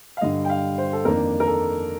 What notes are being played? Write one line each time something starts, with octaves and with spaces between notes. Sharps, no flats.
F5
G2 D3 G3 D#5
G5
F5
C5
A4
F2 D#3 A#3 D4 A#4
A#4
A4